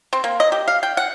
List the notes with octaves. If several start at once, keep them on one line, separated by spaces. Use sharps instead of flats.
C4
A#3
D#5
G4
F5
G5
F#5